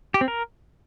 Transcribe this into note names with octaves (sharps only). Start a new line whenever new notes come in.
G4
C4
A#4